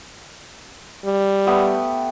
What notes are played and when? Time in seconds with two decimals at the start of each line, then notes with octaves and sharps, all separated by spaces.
1.05 G3
1.47 A3 B3 G4